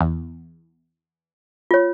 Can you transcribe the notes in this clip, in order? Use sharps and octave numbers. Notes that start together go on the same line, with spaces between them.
E2
F4 C#5